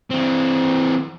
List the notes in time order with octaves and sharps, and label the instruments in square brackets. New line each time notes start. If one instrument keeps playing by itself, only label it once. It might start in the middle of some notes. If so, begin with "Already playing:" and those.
[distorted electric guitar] E3 C4